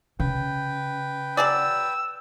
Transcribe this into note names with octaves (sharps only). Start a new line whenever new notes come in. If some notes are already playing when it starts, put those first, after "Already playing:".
C#3 B4 G5
F#3 G#4 D5 E6